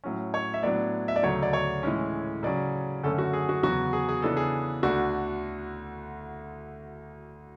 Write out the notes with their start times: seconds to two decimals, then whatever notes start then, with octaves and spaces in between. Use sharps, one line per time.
0.04 A2 F#3 C#4
0.34 C#5
0.54 E5
0.63 A2 F#3 B3 D4 D5
1.08 E5
1.16 D5
1.23 D2 C#3 F#3 A3 C#5
1.43 D5
1.53 C#5
1.83 A2 E3 G#3 C#4
2.43 C#3 F#3 C#4 D5
3.04 F#2 D3 A3 C#4 A4
3.18 F#4
3.33 G#4
3.49 F#4
3.63 E2 C#3 F#3 B3 F#4
3.93 G#4
4.09 G#4
4.22 C#3 E3 B3 D4 A4
4.37 G#4
4.83 D2 D3 A3 D4 F#4